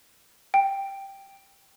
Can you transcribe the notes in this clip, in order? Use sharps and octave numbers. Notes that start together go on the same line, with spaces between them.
G5